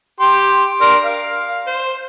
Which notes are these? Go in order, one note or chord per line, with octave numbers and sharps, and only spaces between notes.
G4 C6
D4 A#4 C6
F5
C5